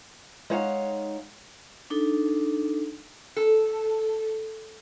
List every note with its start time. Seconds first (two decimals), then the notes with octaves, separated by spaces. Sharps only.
0.50 G#3 D#4 C#5 F5 F#5
1.90 D4 D#4 A4
3.37 A4